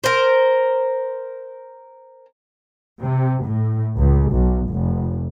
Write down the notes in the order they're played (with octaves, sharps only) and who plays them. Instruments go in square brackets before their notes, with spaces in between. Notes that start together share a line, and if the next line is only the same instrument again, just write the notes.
[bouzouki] A#4 C5
[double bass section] C3
A2
C#2
B1
F1